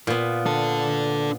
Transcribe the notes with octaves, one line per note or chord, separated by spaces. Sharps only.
A#2 B3
D4 A4